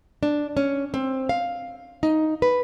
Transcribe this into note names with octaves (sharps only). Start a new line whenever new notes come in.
D4
C#4
C4
F5
D#4
B4